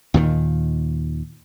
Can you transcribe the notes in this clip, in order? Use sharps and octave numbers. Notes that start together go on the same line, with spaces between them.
D#2 A#2 D#3